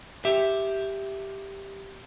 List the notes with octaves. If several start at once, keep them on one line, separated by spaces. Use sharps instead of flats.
G4 E5